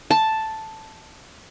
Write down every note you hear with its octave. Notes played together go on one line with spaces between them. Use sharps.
A5